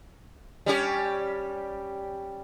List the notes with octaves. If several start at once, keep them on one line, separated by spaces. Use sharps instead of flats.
G3 C#4 G4